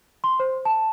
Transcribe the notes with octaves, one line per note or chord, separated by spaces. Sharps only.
C6
C5
A5